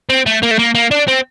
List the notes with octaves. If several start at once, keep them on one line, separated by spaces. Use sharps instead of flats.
C4
A3
A#3
A3
A#3
A#3
D4
C4